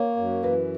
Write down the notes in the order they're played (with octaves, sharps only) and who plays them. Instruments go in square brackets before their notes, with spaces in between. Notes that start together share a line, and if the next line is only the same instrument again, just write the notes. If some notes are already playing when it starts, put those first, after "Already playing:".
Already playing: [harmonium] A#3 [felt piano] C#5
[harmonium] F#2
[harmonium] E3 [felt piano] B4